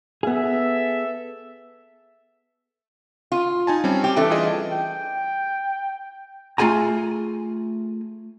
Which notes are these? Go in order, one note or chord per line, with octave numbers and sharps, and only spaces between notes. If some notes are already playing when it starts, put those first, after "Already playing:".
B3 G#4 A4 E5
F4
D#4 G#5 A5
G3 C4 C#4
G4
E3 A3 D4
F4 G#4 D#5
G5
A3 F4 G#4 G#5 A#5